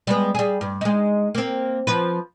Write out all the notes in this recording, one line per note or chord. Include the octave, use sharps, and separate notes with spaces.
G3 G#3 B3
G3 G#4
G2
G#3 D#4
A#3 C4
F3 B4